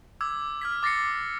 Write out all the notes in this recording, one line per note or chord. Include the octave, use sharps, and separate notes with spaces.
D6 E6 G#6
F6 G#6 B6
D6 A6 A#6 C7 C#7